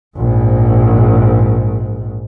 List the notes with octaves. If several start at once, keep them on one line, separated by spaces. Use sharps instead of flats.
A#1 G#2